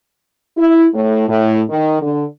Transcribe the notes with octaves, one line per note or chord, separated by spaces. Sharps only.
E4
A2
A2
D#3
D3